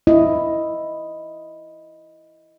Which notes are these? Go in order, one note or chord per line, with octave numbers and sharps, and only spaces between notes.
E4 D#5